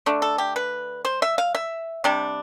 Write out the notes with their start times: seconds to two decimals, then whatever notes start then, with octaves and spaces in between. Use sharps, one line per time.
0.06 D3 A3 D4
0.22 A4
0.38 G4
0.56 B4
1.05 C5
1.22 E5
1.38 F5
1.55 E5
2.04 C3 G3 D4